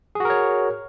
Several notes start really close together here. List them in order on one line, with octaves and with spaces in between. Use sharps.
G#4 F#4 A#4 C#5